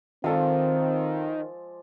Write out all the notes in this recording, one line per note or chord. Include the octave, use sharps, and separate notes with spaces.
D#3 F3 G#3 C4 F4 A4 D5